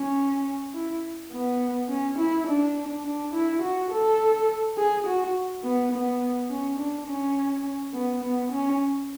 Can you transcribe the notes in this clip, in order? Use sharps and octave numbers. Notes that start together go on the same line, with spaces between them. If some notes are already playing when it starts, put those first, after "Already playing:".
Already playing: C#4
E4
B3
C#4
E4
D4
D4
E4
F#4
A4
G#4
F#4
B3
B3
C#4
D4
C#4
B3
B3
C#4